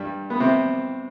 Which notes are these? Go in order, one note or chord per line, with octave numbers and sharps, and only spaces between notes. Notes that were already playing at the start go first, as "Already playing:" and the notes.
Already playing: G2 G3
B3
C3 C4